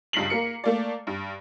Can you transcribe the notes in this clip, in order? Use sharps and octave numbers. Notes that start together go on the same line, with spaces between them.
C#2 G2 B6 C7 F#7
A#3 A#4 C#7
A3 A#3 D5
G2